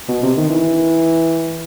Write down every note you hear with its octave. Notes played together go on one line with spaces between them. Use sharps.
B2
C3
D#3
E3